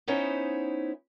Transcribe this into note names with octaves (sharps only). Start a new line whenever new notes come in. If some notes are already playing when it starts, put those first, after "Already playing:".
B3 C#4 D#4 E4 C5 C#5